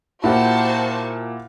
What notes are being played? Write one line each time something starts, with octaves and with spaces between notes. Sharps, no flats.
A#2 E4 F#4 G4 C5 F#5 A5